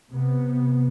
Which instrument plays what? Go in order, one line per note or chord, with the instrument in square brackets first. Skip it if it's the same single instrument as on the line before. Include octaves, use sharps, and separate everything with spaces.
[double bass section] C3 B3